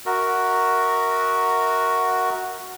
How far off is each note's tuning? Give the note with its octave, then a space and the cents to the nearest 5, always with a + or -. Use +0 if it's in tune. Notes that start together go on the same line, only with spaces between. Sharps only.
F#4 +0 A#4 -5 E5 -35